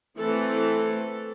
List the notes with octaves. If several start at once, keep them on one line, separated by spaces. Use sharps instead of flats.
E3 A3 C4 A4